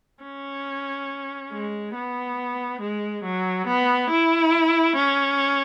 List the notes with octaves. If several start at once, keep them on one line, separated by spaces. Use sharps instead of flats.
C#4
G#3
B3
G#3
F#3
B3
E4
C#4